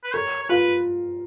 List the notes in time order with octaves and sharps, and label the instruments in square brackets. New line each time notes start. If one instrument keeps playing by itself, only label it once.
[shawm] B4
[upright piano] A#4 [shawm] C#5
[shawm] C#5
[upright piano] F4 [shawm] B4